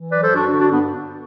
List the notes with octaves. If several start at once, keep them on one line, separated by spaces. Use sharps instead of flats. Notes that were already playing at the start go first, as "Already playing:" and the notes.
Already playing: E3
F#3 B4 D5
A4 C5
G2
D4 F#4
D3 D4 F#4
D4 F#4
G2
B3 D4